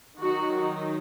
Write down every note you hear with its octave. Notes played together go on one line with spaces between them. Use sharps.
D#3 F#3 D#4 F#4
D#4